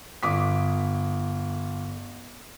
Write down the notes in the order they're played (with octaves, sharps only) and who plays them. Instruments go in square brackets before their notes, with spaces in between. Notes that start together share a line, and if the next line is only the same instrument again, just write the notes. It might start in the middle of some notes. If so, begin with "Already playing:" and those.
[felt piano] G1 D6 D#6 B6